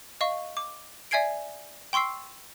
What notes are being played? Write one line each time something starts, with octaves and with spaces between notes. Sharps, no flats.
D#5 F5 C#6
D6
D5 E5 G#5 G#6 C7 D7
G5 C6 C#6 E6 C7